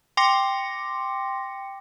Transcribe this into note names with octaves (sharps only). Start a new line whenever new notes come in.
G5 C6 D6 A#6 C#7